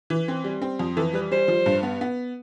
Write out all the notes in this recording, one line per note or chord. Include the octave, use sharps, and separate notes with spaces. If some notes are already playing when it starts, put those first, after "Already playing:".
E3
C4
G3
C4
F2
E3 A4
G3 B4
G3 C5
F3
G2
B3
B3